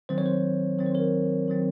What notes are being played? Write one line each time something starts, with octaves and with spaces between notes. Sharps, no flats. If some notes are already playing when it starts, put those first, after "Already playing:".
D#3 F#3 C4 C5
C#5
C5
D#3 F#3 C4 C#5
C5
A#4 C#5
D#3 F#3 C4